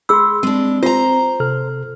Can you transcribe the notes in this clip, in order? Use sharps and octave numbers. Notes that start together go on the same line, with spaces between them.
G#4 B5 C6 E6
G#3 C4 D4
F4 C5 A#5
C3 A4 F6